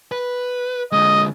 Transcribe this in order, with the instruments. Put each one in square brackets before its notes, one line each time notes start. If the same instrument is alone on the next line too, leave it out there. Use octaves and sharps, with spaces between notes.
[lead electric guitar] B4
[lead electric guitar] D3 G#3 [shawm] D#5